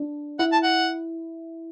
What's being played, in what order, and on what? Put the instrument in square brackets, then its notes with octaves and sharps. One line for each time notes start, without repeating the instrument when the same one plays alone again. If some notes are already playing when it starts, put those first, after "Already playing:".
Already playing: [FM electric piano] D4
[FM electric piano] E4 [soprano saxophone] F#5
[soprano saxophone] A5
F#5